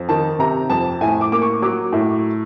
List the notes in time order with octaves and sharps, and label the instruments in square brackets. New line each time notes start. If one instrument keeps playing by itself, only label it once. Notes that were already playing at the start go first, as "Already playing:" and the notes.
Already playing: [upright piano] F2
D#3 A5
C3 A#5
F2 A5
A2 G#5
D6
A#3 D6
C#6
F#3 D6
A2